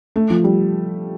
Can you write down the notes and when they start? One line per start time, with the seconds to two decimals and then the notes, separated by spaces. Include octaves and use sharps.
0.16 A3
0.30 F3
0.44 G3